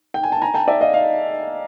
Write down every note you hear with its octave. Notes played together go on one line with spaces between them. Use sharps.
G5
G#5
A5
G#5 A#5
G5 A5
D5 E5
D#5 F5
D#5 F5